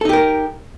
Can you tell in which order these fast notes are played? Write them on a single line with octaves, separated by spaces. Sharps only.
A4 D#4 G4 A#4